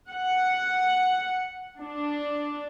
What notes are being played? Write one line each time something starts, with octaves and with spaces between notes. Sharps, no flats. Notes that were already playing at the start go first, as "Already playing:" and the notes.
F#5
D4